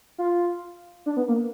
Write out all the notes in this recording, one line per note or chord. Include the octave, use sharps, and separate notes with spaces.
F4
D4
B3
A#3